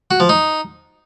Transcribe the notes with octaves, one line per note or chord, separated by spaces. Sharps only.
F#4
F3
D#4